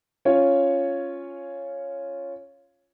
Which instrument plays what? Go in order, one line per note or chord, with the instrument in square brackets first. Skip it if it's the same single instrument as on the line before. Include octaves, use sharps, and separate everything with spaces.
[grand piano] C#4 F4 C#5